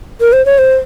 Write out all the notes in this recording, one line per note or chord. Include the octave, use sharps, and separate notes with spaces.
A#4
C5
C#5
C5